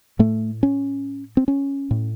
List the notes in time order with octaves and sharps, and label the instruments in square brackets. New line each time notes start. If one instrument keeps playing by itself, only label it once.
[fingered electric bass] A2 A3
C#4
C4
C#4
A2